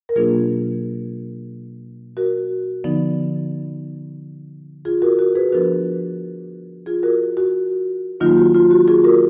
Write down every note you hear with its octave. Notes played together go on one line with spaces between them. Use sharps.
A#4
B2 F#3 A#3 D4 F4 G#4
F#4 A#4
D3 F3 B3 D#4
F4 G#4
F#4 A#4
F#4 A#4
G#4 B4
F3 B3 D4 F#4 A#4
F4 G#4
F#4 A#4
F#4
D#3 F#3 A#3 D#4 F4
F#4
F4
F#4
F4 G#4
F#4 A#4